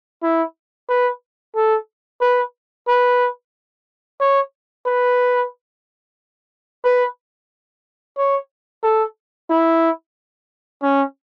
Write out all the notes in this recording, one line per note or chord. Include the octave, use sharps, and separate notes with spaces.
E4
B4
A4
B4
B4
C#5
B4
B4
C#5
A4
E4
C#4